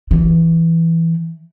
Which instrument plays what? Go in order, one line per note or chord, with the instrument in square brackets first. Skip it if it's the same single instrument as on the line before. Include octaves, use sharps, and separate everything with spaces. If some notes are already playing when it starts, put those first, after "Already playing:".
[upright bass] E3